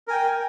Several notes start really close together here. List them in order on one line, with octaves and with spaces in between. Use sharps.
A#4 G#5 G5